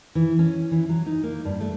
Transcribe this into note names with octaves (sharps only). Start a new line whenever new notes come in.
E3
C#4
E3
F#3
D#4
A#3
G2
A3